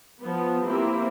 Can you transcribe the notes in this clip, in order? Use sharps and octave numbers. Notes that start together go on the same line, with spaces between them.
F3 B3
A#3 C4 E4 G4